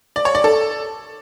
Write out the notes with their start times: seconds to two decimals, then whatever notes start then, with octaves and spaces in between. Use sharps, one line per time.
0.16 D5
0.25 C#5
0.35 D5
0.44 A4